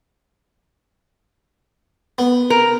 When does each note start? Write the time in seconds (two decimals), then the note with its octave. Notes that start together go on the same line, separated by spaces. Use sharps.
2.18 B3
2.50 A#4